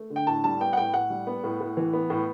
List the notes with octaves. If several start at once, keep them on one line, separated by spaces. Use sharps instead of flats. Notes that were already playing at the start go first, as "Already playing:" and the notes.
Already playing: A3
D3
G5
A2 A5
G3 A5
B3 G5
F#5
A2 G5
A2 F#5
G3
B3
A2
A2
E3
B3
A2